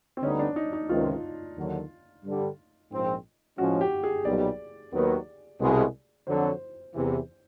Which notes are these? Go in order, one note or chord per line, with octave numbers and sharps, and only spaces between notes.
C4
D2 D3 G3 B3 C#4 D#4
D4
D#4
D#4
C#2 C3 D#3 F4
D#2 D3 F#3
G2 D3 G3
A#1 G#2 F3 G#3 C4
A2 F3 G#3 C#4 F#4
G4
G#4
B1 A#2 G3 D5
D#2 D#3 F#3 B3
C2 B2 G#3
F2 D3 F#3 C5
E2 C3 E3